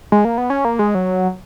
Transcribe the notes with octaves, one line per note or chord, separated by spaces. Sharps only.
G#3
A#3
B3
C#4
A#3
G#3
F#3